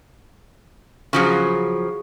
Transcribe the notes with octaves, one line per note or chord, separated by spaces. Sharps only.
C#3 F3 F#3 G#4 C#6